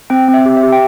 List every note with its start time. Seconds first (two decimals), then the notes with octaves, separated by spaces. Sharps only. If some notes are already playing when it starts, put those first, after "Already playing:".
0.10 C4 G5
0.28 C4
0.34 E5
0.46 G4
0.57 E5
0.63 G4
0.73 G5